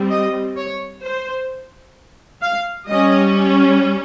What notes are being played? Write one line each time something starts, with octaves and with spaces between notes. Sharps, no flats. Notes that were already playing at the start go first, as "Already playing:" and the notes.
Already playing: G3 C4
D#5
C#5
C5
F5
G3 C#4 D#5